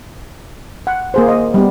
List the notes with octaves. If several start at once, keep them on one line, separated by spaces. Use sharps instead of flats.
F#5
A#3 G#4 C5
D#5
G3 B3